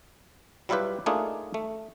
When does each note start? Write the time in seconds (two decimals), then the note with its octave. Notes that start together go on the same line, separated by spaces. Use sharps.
0.69 F#3 G3 E4 F4 G4 B4
1.06 A3 A#3 D4 D#4 F4 G#4
1.54 A3